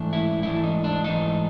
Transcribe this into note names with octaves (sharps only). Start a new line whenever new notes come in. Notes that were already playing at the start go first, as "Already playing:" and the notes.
Already playing: G#2 E3 A3 D4
E4
G#2 E3 A3 D4 E4
D#4
D4
G#2 E3 A3 D4 D#4